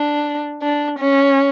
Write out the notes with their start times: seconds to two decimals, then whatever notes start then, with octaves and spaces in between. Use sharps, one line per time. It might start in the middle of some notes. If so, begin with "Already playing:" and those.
Already playing: D4
0.62 D4
0.99 C#4